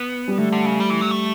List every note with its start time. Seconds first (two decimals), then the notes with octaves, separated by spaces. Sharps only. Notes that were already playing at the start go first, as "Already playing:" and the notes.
Already playing: B3
0.28 G3
0.38 D3 A3
0.52 D3
0.66 C#3
0.80 G3
0.90 E3
1.01 F#3
1.11 A3